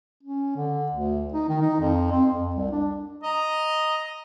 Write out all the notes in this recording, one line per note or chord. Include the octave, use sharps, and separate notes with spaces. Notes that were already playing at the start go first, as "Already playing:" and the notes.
C#4
D3
D2
D#4
D#3
D#4
F2
C4
F2
C2
D4
D#5 A#5